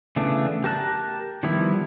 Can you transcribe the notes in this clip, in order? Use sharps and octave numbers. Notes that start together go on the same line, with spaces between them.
C#3 E3 A3 B3 D4
G4 A#4 A5 F#6
D#3 F3 G3 B3 E4